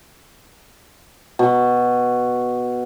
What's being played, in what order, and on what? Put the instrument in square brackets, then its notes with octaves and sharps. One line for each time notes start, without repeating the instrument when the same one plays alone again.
[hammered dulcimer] B2